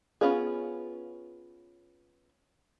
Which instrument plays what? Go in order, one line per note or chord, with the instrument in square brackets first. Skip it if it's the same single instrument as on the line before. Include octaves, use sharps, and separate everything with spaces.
[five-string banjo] B3 C#4 F4 G#4